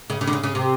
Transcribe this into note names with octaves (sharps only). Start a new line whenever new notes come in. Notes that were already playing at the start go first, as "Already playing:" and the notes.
C#3
C#3
D3
C#3
C#3
C3